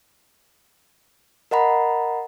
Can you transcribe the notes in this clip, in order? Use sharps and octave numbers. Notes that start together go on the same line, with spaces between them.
A#4 D#5 F#5 A#5 B5